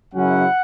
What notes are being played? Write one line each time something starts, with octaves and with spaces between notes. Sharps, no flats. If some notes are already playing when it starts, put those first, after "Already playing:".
F#2 C#3 F#3 C#4 E4 F#5